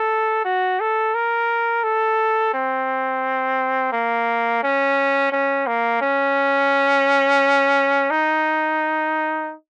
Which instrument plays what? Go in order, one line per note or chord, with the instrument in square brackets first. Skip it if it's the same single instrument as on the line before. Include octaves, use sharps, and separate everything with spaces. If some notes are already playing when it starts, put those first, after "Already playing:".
Already playing: [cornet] A4
F#4
A4
A#4
A4
C4
A#3
C#4
C#4
A#3
C#4
D#4